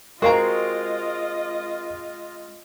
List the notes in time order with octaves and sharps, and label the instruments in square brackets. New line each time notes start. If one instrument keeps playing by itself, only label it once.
[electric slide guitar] G#3 C4 [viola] F4 D#5 [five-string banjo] F#4 F5 A#5 [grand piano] A#4